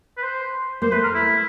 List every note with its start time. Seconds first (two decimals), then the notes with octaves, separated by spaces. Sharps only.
0.17 B4
0.23 C5
0.82 A#3 C5
0.92 A3 B4
1.03 A#4
1.14 E4